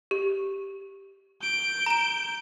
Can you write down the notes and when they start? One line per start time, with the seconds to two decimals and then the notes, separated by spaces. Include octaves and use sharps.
0.11 G4
1.42 G6 D7
1.86 A#5 E7